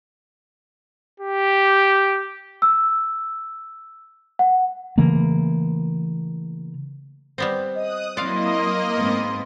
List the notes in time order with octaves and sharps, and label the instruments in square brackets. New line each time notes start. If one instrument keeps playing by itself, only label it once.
[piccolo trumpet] G4
[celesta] E6
F#5
[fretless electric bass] C#3 E3 A3 A#3
[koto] G3 B3 C4
[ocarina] D#5 [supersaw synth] D#6 F#6
[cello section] F#3 C4 E4 [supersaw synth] A#3 D#5 [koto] D5 F5 [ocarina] C6
[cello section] G#2 B3 C4